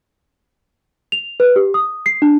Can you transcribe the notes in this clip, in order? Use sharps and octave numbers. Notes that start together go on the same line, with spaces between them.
F7
B4
G4
D#6
C7
D4